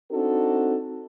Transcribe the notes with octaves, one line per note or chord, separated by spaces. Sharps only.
C4 D4 D#4 F#4 A4